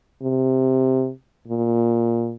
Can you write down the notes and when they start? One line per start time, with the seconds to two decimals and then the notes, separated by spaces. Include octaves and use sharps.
0.22 C3
1.48 A#2